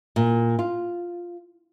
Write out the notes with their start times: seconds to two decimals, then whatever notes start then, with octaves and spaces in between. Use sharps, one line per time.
0.16 A#2
0.59 F4